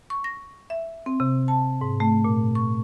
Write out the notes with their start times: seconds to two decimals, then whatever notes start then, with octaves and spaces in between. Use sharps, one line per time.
0.10 C#6
0.24 A#6
0.70 E5
1.06 C4
1.20 C3
1.48 A5
1.81 G#2
2.00 A3
2.25 A#2
2.55 C#6